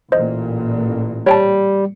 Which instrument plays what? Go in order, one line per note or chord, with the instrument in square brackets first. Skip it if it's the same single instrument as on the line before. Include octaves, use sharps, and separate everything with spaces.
[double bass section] A1 A#2 [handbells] C5 D#5
[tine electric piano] G3 [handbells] C#5 G5 A5